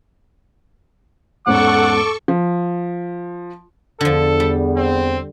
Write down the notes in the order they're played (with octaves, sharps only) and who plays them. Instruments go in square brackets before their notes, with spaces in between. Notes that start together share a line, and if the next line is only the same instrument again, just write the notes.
[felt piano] E2 G#2 C#4 [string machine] A4 C#6 [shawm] F#5 [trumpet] D6
[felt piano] F3
[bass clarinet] E2 [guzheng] D3 F3 [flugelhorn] A4
[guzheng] G3
[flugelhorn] C4